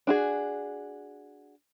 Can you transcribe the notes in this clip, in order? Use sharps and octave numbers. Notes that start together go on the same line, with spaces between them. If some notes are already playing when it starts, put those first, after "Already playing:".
D4 F#4 G#4